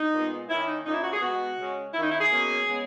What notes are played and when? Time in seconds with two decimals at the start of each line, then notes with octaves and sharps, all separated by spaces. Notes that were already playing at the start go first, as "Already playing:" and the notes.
Already playing: D#4
0.14 A#2 G#3 B3
0.48 D#3 A#3 C#4 E4
0.67 D#4
0.85 A#2 A#3 C#4 D#4
0.94 E4
1.04 F#4
1.13 G#4
1.21 B2 G#3 B3 F#4
1.58 C#3 G#3 C#4
1.93 D#3 A#3 C#4 E4
2.03 D#4
2.11 E4
2.21 G#4
2.30 B2 F#3 A#3 C#4
2.66 C#3 G#3 B3